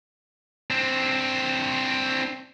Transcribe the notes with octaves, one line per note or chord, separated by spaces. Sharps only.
C4 D4